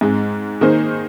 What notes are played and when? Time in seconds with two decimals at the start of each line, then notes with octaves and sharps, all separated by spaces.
0.01 G#2 G#3 C4
0.61 D#3 A#3 D#4 G#4 C5